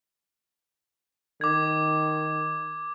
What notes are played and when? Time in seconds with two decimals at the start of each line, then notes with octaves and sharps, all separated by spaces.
1.41 D#3 D6 G#6